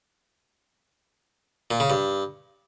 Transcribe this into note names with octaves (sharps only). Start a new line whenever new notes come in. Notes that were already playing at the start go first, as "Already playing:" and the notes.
A#2
C#3
G2